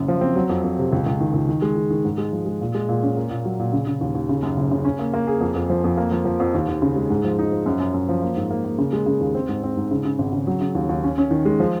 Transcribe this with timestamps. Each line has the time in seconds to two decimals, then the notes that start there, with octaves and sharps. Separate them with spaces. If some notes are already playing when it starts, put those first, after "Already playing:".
Already playing: F#1 F#2
0.08 F3
0.21 C4
0.36 F#3
0.50 F2
0.64 F2
0.78 C3
0.93 C#2
1.07 C#2
1.20 D#3
1.34 C#2
1.49 D#3
1.62 G#3
1.76 D#3
1.90 D#3
2.05 G#2
2.18 G#3
2.32 F3
2.46 G#3
2.61 A#2
2.75 G#3
2.89 A#2
3.03 C#4
3.17 A#3
3.30 A#2
3.45 F#3
3.59 A#2
3.73 C#3
3.87 C#3
4.01 D#2
4.15 D#2
4.29 C#3
4.43 F#2
4.57 F#1
4.71 C#3
4.85 C#4
4.99 A#3
5.14 A#3
5.27 G#4
5.41 F2
5.56 F2
5.70 F3
5.84 F2
5.97 A#3
6.12 F3
6.25 F3
6.40 F2
6.54 D#2
6.68 D#2
6.82 C#3
6.96 G#3
7.10 G#2
7.24 F3
7.39 D#4
7.52 F3
7.66 F#2
7.80 F#2
7.94 F#2
8.09 F3
8.22 A#3
8.37 G#2
8.51 A#3
8.65 A#3
8.78 C#3
8.93 G#3
9.06 C#3
9.20 D#2
9.35 C4
9.49 G#2
9.63 C4
9.77 G#2
9.91 C#3
10.05 C#3
10.19 G#1
10.33 C#3
10.47 F#3
10.61 C#3
10.75 D#2
10.89 D#2
11.04 C#4
11.18 C#4
11.31 D#3
11.45 G#3
11.60 F3